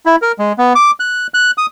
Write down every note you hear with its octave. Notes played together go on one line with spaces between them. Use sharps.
E4
A#4
G#3
B3
D6
F#6
F#6
D#6